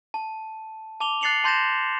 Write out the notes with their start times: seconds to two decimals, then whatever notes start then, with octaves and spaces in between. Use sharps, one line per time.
0.14 A5
1.00 A5 D6 F7 G7
1.21 F#6 A6 C7 C#7 F7 F#7
1.44 A5 C6 G6 A6 A#6 E7